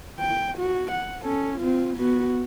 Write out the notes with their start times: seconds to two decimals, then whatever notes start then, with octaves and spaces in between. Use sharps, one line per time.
0.20 G5
0.58 F#4
0.92 F#5
1.24 C#4 A4
1.59 C4 F4
1.97 B3 F#4